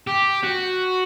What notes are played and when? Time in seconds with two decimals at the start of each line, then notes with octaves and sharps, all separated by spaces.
0.07 G4
0.43 F#4